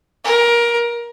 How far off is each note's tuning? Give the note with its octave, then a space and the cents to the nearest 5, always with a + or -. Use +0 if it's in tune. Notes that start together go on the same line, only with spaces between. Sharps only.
A#4 +20